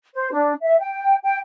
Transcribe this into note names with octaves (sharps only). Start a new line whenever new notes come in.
C5
D4
E5
G5
G5